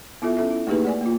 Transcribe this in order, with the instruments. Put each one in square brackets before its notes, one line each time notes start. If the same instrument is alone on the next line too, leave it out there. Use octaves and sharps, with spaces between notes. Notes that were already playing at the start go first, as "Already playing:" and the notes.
[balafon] B3 E4 F4 A4 E5
C#4 A4 E5
E4
A3 A#3 D#4 G4 G#4 B4
A3 D5 G#5
A#3 F4